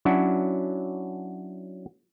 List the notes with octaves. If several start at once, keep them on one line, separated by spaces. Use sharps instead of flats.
F#3 C#4 D4 E4 F#4